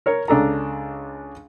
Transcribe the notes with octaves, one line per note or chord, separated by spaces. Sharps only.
A#4 C#5
C#2 D4 A4 A#5